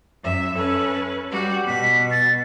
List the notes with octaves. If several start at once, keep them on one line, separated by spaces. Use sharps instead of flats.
F#2 E5
C#4 A4 B4
G3 F#4 G4 F#5
B2 B6
A6